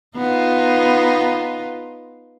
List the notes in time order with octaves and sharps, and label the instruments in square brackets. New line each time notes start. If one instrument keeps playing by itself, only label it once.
[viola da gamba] B3 D#4 F4